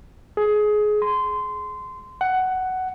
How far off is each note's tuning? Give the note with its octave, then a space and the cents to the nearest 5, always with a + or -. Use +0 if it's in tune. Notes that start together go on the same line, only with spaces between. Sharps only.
G#4 +20
C6 -20
F#5 +10